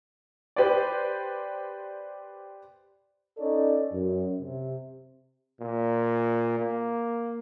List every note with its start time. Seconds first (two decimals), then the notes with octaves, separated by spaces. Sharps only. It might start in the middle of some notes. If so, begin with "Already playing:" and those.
0.56 G4 B4 C5 D5
3.38 C#4 D#4 A4 C#5 D5
3.93 F#2
4.41 C3
5.61 A#2
6.59 A#3